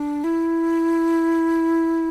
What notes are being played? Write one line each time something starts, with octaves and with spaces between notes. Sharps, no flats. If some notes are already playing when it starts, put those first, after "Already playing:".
Already playing: D4
E4